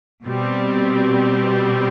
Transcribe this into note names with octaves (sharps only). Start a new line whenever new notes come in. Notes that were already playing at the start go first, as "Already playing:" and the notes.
B2 G3 C4